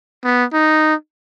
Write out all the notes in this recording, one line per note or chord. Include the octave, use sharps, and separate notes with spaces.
B3
D#4